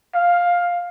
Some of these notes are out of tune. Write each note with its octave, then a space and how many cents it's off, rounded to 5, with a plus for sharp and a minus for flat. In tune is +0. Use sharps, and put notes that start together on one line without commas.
F5 +10